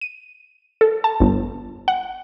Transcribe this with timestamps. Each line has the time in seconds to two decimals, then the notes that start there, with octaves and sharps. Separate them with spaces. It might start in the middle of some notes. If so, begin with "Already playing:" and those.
0.01 D#7
0.81 A4
1.04 A5
1.20 G1
1.88 F#5